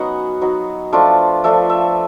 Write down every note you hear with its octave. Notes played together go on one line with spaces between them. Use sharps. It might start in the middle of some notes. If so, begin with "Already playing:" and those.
Already playing: F#3 B3 C#4 D#4 F#5
F#3 B3 D#4
F3 A3 D4 F4
F3 A3 D4 F4 E5
E5